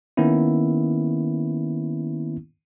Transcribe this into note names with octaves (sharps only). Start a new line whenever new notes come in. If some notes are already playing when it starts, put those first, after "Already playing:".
D#3 A#3 B3 C#4 E4